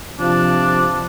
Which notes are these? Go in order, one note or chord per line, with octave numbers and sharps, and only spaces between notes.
C3 F3 D4